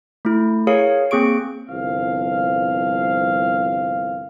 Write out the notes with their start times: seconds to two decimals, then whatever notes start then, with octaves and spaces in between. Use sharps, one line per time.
0.25 A3 E4
0.67 G#4 A#4 C#5 F5
1.11 A#3 C4 G#4 C#6 D7
1.70 G1 C2 F3 F5